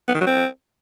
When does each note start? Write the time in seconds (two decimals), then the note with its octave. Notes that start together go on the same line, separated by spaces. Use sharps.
0.08 B3
0.14 D#3
0.21 F#3
0.27 C4